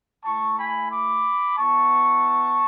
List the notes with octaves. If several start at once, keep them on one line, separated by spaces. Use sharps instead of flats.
A3 E4 A5 C#6
G#5 B5
B5 D6
B3 E4 A5 C#6